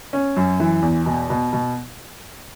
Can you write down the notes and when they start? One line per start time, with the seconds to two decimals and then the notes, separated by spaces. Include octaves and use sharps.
0.13 C#4
0.37 F#2
0.60 E3
0.82 E2
1.06 B2
1.30 B2
1.53 B2